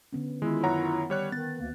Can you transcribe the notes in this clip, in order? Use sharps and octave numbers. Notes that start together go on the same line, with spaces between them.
D3 B3 C#4
D#3 G#3 B3 E4 F4
F#2 C#5 F#5 A#5
G3 C#5 F#6
D#3 B3 A6
D2 A#3